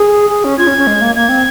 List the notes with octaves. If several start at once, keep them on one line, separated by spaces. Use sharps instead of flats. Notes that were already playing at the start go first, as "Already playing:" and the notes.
Already playing: G#4
G#4
C#4
F4 G#6
C#4
C#4
G#3
A#3
A#3 G#6
C4